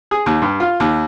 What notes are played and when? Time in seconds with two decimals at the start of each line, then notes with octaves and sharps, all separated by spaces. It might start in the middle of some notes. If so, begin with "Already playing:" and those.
0.11 G#4
0.26 D#2
0.42 G2
0.60 F4
0.80 D#2